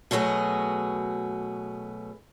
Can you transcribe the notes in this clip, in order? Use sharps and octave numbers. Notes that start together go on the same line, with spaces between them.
B2 F#3 A3 B3 G#4